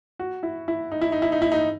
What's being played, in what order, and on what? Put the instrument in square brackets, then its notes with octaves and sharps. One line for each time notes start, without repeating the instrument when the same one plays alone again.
[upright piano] F#4
E4
E4
D#4
E4
D#4
E4
D#4
E4
D#4